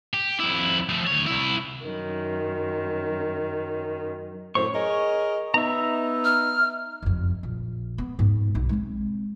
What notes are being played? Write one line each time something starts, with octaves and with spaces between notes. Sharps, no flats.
G4
F2 E4
F3 A3
D2 C#5
C2 E4
F#2 D#3
F#2 A2 C5 C#5 C#6
G#4 A#4 D#5
B3 D#4 E5 A#5
F6
F#1 F2
A#1
B3
G#2 B3
B1 D#4
G#3 C4